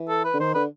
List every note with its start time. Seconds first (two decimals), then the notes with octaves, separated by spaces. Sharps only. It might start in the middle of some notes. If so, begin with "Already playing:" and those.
Already playing: E3
0.09 A4
0.24 B4
0.34 D3
0.40 D#3 C5
0.54 D3 B4